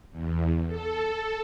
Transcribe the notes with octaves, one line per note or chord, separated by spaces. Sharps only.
E2
A4